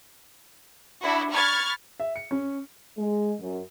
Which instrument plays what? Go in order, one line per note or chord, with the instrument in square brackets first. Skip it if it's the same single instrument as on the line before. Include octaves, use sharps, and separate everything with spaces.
[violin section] D4 E4 F#4
B5 C#6 F6 G#6 A6
[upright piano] E5
C#7
C#4
[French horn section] G#3
F#2